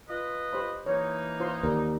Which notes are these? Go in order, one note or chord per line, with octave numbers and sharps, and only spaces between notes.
F4 B4 D#5
G4 C5 B5
E3 A#3 D#4 C#5
F4 C5 C6
D#2 A#4 D5